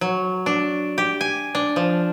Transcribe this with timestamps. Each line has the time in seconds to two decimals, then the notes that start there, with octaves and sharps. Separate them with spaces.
0.01 F#3
0.46 D4
0.98 G4
1.21 G#5
1.55 D4
1.76 F3